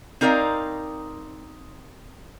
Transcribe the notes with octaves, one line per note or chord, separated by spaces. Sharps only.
C4 D#4 A#4 D5 F5